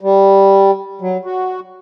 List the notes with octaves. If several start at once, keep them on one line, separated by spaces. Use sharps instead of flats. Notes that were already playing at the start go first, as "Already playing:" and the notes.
G3
F#3
F#4